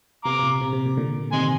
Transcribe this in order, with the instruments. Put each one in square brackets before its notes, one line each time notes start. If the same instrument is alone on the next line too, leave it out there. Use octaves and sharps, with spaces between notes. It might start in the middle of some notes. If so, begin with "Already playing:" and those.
[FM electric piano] C3 [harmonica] A#5 D6
[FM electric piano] C3
A#2
C3
C3
A#2
A#2 D3
[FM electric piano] C3 D#3 [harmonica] G#5 C6